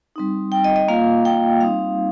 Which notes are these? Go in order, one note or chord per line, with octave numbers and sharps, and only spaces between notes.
G3 C4 D#4
G5
D#5
D#5
A#3 F4 F5
G5
G3 C4 D#4 F5